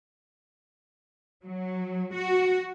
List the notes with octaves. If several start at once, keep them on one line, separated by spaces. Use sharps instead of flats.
F#3
F#4